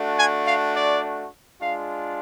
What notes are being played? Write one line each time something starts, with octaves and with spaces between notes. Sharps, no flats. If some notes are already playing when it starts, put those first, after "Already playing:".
Already playing: A3 D4 F#4
G#5
F5
D5
G#3 D4 F4 F5